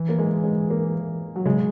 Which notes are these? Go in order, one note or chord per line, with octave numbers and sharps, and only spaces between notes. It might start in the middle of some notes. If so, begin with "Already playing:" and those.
Already playing: E3
A#3
G#3
G#3
A#3
F#3
C#3 G#3